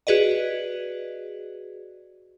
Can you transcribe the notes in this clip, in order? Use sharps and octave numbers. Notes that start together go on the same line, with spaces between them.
F#4 G#4 B4 D5 D#5